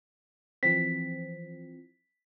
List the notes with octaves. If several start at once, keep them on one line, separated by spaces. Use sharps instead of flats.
E3 F3 C4 B6